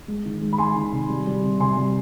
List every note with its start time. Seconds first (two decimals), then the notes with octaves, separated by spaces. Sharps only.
0.08 G#3
0.25 D#3
0.42 G#3
0.53 B5
0.58 G#3 G#5 C6
0.76 D#3
0.92 C3
1.09 G3
1.27 G3
1.43 C3
1.60 C3 G#5 C6
1.77 G3